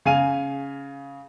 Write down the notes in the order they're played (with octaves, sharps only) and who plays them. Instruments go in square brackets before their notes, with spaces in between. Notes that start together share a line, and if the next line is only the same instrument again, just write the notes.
[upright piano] C#3 F5 G#5 D#7 F7